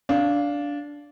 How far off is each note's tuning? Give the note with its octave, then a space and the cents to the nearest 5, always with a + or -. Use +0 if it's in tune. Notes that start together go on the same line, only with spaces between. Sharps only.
D4 -15 F5 +0